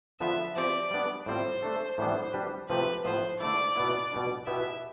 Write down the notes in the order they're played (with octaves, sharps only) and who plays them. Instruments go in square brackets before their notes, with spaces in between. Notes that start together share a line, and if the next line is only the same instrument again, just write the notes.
[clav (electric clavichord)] D3 F3 B3 F4 B4 [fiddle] E5
[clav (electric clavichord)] F3 C4 G4 [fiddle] D5
[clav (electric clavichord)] G3 B3 D4
[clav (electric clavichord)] A2 G3 C4 F4 [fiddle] C5
[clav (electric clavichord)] A3 D4 A4
A2 E3 G3 B3 D4
G3 D4 G4 B4
[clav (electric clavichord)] C3 F3 A3 C4 G4 [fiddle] B4
[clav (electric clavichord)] A2 F3 B3 [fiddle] C5
[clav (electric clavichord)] D3 A3 E4 [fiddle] D5
[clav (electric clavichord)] B2 B3 E4
B2 G3 D4
[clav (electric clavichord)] B2 B3 E4 G4 B4 [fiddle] E5